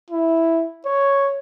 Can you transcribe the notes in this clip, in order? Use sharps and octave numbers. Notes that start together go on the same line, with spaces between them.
E4
C#5